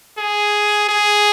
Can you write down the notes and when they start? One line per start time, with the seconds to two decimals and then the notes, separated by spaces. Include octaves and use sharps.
0.18 G#4
0.89 G#4